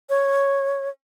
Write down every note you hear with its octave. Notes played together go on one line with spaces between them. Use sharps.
C#5